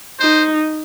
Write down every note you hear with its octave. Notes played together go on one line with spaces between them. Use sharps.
D#4 C5